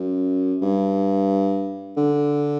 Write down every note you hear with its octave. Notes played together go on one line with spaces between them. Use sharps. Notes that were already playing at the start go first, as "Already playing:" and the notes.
Already playing: F#2
G2
D3